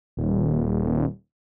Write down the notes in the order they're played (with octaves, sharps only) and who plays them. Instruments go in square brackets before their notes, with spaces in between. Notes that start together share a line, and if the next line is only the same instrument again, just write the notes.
[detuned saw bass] D#1